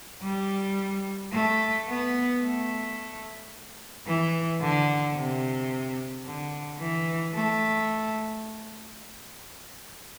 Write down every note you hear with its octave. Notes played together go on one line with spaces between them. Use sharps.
G3
A3
B3
A3
E3
D3
C3
D3
E3
A3